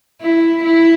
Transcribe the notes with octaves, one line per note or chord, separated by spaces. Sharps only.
E4
E4